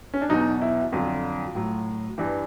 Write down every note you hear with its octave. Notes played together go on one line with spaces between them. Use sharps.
C#4
D4
E2 B2 F#3 D#4
E4
F2 D3 F#3 F4
A2 F#3
G2 E3 G4